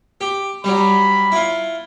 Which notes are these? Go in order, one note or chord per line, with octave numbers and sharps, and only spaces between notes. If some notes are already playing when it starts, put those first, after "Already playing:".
G4
F#3 G3 B5
E4 F4